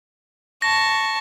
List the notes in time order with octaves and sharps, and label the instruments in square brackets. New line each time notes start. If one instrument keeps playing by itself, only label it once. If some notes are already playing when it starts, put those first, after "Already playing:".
[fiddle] A5 C#6 [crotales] A#6